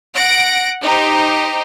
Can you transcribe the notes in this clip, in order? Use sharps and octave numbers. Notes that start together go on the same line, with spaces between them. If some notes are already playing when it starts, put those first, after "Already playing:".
F#5 A#6 D7
D#4 G4 C5